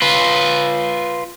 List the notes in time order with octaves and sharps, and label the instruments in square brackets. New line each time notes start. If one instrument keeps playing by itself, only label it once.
[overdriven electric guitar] F4 B4